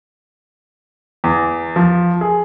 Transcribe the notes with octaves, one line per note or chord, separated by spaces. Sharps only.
E2
F3
G#4